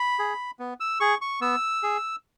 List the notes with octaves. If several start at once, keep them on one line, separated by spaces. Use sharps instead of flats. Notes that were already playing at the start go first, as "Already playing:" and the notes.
Already playing: B5
G#4
B3
E6
G#4 C#6
C#6
B3 E6
G#4